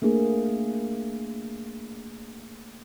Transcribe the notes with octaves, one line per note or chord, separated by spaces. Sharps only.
A3 A#3 D4 G#4